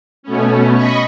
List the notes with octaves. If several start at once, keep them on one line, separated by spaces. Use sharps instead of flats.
B2 A3 B3 C#4
D#5 B5 C#6